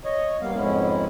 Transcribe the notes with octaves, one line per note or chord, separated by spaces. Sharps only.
C#5 D#5
G3 A#3 B3 F5
F2 G#2 G#3 B3 C#4 E4